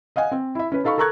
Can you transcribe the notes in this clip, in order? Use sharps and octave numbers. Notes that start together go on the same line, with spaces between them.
D#5 F5 F#5 G#5
C4
E4 E5
C#4 B4
D#4 A4 F5 B5 C#6
A4 A#4 A#5 C#6 F#6 G#6